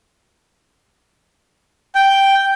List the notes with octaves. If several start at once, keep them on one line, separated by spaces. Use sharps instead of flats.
G5